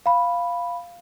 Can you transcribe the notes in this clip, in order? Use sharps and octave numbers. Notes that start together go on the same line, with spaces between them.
F5 B5